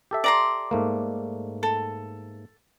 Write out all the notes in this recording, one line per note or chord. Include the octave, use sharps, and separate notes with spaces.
G4 A4 E5
D5 A#5 C6
G#2 A3 A#3
A4